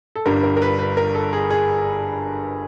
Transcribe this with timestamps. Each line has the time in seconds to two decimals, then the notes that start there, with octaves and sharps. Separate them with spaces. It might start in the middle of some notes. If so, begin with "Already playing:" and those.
0.15 A4
0.25 G1 G2 D3 G3 A#4
0.43 A#4
0.57 A#4
0.62 B4
0.79 B4
0.97 A#4
1.15 A4
1.33 G#4
1.50 G#4